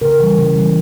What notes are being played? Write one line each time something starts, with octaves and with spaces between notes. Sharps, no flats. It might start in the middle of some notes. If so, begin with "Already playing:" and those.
C#3 A#4
E3 G3
C#3
E3 G3